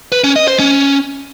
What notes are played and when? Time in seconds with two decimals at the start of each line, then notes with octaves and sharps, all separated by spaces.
0.12 B4
0.24 C#4
0.36 D#5
0.48 C5
0.60 C#4